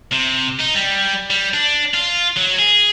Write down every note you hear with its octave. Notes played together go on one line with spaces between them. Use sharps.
C3
D#4
G3
G3
D4
F4
F#3
G#4